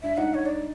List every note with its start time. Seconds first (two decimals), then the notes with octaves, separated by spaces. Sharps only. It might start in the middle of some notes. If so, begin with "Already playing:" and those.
0.03 D4 E5
0.17 D#4 F#5
0.34 C#5
0.46 D5